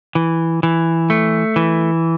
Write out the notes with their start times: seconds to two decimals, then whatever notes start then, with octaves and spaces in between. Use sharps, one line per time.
0.15 E3
0.63 E3
1.10 A3
1.56 E3